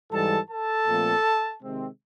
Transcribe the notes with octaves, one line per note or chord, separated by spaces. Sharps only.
G#2 E3 G3 A4 A5
A4 A5
A#2 F3 A3 C4
C3 D#3 G#3 C4